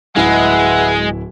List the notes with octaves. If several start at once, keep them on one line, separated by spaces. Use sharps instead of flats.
D1 G#3 E4 B4 E5 F#5 G#5